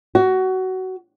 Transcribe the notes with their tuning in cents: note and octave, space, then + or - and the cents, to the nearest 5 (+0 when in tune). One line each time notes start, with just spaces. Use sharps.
F#4 +20